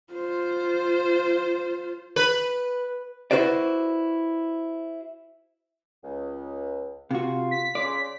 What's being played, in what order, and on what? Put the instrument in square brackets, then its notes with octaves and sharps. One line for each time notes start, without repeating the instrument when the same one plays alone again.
[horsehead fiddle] F4 C5
[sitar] B4
[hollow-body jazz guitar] E4 F#4 B4 C5 D5
[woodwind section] C#2
[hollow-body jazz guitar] C3 F#4 [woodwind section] F4
[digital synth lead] B6
[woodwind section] C#3 C6 [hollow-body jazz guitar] D5